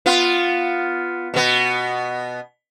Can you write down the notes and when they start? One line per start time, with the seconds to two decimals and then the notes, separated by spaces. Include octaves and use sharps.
0.06 B3 F4
1.34 B2 B3